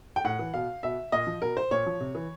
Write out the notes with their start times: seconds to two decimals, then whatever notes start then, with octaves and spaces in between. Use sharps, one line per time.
0.16 G5
0.24 A2 F#5
0.39 E3
0.54 B2 F5
0.83 B2 E5
1.12 A#2 D#5
1.27 F3
1.42 B2 A#4
1.57 C5
1.71 A#2 C#5
1.86 F3
2.00 C3
2.15 E3